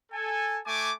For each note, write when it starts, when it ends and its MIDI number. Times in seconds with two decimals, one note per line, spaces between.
0.12 0.57 69
0.12 0.57 80
0.65 0.92 57
0.65 0.92 80
0.65 0.92 86